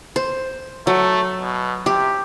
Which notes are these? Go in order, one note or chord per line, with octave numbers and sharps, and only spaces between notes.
C5
F#3 A3
B2
C3 G4